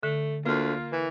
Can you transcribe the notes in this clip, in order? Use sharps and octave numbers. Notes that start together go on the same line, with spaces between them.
D3 A3
D2 A#3 F4
E3